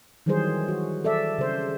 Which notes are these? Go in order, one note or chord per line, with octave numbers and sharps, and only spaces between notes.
D#3 E3 F#3 G3 G#4 C5
F#4
A4 D5 E5
C#3 C5